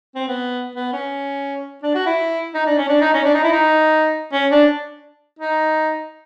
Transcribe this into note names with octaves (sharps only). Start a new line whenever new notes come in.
C4
B3
B3
C#4
D4
F#4
E4
D#4
D4
C#4
D4
D#4
C#4
D4
D#4
E4
D#4
C#4
D4
D#4